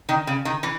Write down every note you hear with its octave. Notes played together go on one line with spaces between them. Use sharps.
D#3
C#3
D#3
E3